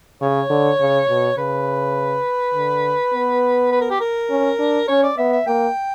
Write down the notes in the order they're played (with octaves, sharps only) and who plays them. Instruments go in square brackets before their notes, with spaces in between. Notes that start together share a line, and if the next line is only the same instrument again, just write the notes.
[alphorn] C#3 [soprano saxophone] C#5
[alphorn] D3
C#3
B2
[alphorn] C#3 [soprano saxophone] B4
[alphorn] D3
B3
[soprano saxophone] B4
A#4
G4
A#4
[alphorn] C#4
D4
[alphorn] C#4 [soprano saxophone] C#5
[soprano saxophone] D5
[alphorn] B3 [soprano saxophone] E5
[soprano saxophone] E5
[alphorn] A#3 [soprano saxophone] G5